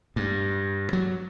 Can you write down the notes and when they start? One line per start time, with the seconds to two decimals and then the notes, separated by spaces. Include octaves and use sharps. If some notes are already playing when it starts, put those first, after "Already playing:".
0.16 G2
0.93 F#3